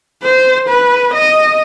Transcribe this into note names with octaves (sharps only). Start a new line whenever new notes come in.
C5
B4
D#5